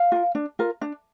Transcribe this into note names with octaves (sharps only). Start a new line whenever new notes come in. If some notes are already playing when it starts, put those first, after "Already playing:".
Already playing: F5
F4 A#4
D4
F4 A#4
D4